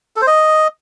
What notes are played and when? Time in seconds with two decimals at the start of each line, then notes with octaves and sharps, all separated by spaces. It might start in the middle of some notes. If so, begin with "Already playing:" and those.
0.16 A4
0.22 C5
0.27 D#5